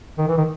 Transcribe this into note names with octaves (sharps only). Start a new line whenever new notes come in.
D#3
E3
D#3